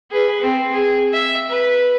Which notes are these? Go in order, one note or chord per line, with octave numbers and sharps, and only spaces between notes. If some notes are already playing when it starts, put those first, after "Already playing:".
G#4 B4
C4
G#4
E5
B4